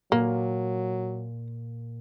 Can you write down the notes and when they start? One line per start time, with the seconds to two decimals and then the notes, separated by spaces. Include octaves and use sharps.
0.12 A#2 F#3 A#3